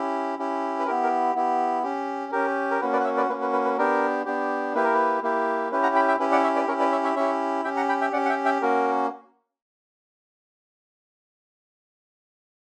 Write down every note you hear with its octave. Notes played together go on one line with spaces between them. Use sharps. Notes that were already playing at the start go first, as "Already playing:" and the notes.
Already playing: C#4 E4 G4
C#4 E4 G4
B4
B3 E4 G4 A#4
A#4
B3 E4 G4
C#4 G4
C#4 G4 A#4
A#4
A#3 C#4 F#4 B4
B4 D5
F#5
C#5 E5
B4 D5
A#3 C#4 F#4 B4
B4
B4
B4
B3 D4 G4 A#4
B3 D4 G4
A#3 E4 G4 B4
A#4
B4
A#3 E4 G4
C#4 E4 G4 B4
F#5 A#5
G5 B5
E5 G5
C#4 E4 G4 B4
D5 F#5
C#5 E5
B4 D5
C#4 E4 G4 A#4 C#5
B4 D5
C#5 E5
C#5 E5
C#4 E4 G4 C#5 E5
C#4 G4 E5 G5
F#5 A#5
G5 B5
E5 G5
C#4 G4 D5 F#5
F#5
E5 G5
E5 G5
A#3 C#4 F#4 A#4